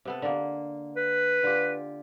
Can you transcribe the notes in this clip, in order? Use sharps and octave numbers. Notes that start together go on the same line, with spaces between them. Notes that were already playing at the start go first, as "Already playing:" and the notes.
C3 B3 A4
D3 A#3
B4
D3 F4 G4